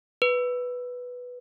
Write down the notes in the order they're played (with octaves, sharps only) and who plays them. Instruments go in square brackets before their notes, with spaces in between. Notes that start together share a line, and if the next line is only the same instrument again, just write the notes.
[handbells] B4